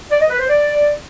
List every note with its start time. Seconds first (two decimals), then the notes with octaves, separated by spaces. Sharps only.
0.11 D5
0.21 D#5
0.30 B4
0.40 C5
0.50 D5